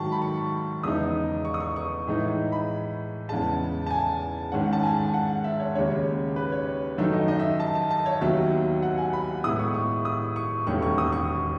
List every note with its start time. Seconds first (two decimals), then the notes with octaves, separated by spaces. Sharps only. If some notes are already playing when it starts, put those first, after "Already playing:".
Already playing: G#2 D#3 F#3 A5 C#6
0.12 B5
0.22 C#6
0.83 E2 C#3 G#3 D#4 D#6
1.45 C#6
1.54 D#6
1.60 C#6
1.76 C#6
2.07 A2 E3 G#3 D#4
2.52 B5
3.29 E2 C#3 G#3 A5
3.86 A5
3.90 G#5
4.52 G#2 D#3 G#3 C#4 F#5
4.73 A5
4.83 G#5
4.98 A5
5.14 F#5
5.44 E5
5.60 C#5
5.75 D#2 C#3 G#3 C#4 C#5
6.36 B4
6.52 C#5
6.98 F#2 D#3 A3 D#4 E5
7.13 D#5
7.28 D#5
7.39 E5
7.60 A5
7.75 A5
7.91 A5
8.06 C#5
8.21 D#2 D#3 F#3 B3 E5
8.82 F#5
8.98 G#5
9.13 B5
9.44 A2 G#3 B3 E4 D#6
9.59 C#6
9.74 C#6
10.05 D#6
10.36 C#6
10.66 E1 D#2 D#3 A3 C#4 C#6
10.82 C#6
10.98 D#6
11.12 C#6